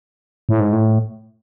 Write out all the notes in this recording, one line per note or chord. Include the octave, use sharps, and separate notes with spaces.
A2
G#2
A2